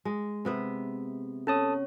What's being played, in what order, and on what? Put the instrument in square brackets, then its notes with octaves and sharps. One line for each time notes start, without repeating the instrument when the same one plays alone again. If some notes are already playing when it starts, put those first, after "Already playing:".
[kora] G#3
C3 B3 E5
[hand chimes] C#4 C#5 [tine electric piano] A4 A5 D#6